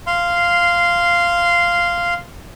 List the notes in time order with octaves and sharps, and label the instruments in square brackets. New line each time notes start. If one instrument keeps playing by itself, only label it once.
[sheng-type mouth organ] F5 C6